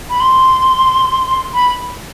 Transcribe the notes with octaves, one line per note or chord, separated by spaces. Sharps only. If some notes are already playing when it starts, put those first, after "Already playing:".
B5
C6
B5